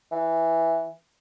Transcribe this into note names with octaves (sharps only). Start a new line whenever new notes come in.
E3